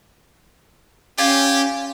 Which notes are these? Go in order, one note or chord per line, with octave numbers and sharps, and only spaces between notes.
C#4 F4 G4 D5 G#5